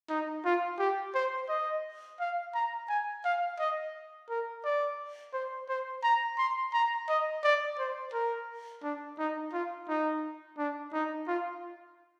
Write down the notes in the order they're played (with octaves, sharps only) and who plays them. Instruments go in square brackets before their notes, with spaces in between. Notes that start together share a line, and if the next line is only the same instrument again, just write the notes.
[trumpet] D#4
F4
G4
C5
D#5
F5
A#5
G#5
F5
D#5
A#4
D5
C5
C5
A#5
C6
A#5
D#5
D5
C5
A#4
D4
D#4
F4
D#4
D4
D#4
F4